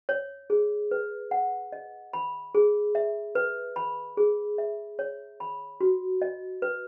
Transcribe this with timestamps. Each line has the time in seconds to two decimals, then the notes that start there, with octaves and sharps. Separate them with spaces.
0.09 C#5
0.50 G#4
0.91 B4
1.31 F#5
1.72 D#5
2.13 B5
2.55 G#4
2.95 E5
3.35 B4
3.76 B5
4.17 G#4
4.58 E5
4.99 C#5
5.40 B5
5.81 F#4
6.22 D#5
6.62 B4